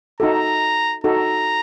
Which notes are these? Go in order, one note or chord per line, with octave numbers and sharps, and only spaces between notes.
D#4 F#4 A4 A#5
D#4 F#4 A4 A#5